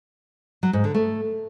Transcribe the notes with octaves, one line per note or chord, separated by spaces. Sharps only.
F#3
G#2
D3
A3